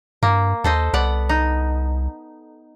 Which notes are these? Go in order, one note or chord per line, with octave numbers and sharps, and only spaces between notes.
G2 A#3
D#2 A4 C5 D#5
C2 B3 D5 F#5
D#4